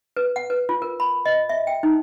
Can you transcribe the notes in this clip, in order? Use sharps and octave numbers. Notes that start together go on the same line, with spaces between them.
B4
F#5
B4
F4
A#4
B5
D#5
E5
G5
D#4